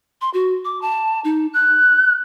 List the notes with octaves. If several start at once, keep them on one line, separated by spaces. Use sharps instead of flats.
C6
F#4
D6
A5
D#4
F#6